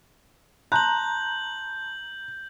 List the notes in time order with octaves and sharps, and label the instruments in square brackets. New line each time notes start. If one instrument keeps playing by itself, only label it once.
[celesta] A5 C6 F#6 [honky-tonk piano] A#5 [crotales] G6 F#7